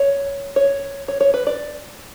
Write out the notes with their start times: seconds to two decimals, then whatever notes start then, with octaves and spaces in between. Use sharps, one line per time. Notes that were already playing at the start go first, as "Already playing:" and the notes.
Already playing: C#5
0.56 C#5
1.08 C#5
1.21 C#5
1.34 B4
1.47 D5